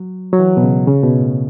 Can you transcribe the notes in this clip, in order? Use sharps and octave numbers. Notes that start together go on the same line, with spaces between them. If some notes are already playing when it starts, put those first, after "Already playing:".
Already playing: F#3
F#3
E3
B2
C#3
C#3
B2
A2